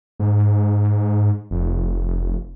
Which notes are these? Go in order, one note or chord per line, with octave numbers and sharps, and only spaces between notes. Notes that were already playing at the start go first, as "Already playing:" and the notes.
G#2
F1